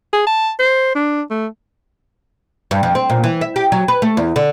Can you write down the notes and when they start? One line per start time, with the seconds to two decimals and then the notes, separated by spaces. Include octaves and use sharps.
0.13 G#4
0.27 A5
0.60 C5
0.96 D4
1.31 A3
2.71 G2
2.83 F2
2.95 C4
3.10 A#2
3.24 E3
3.41 E5
3.56 G4
3.72 F#3
3.88 B4
4.02 A3
4.17 E2
4.36 D3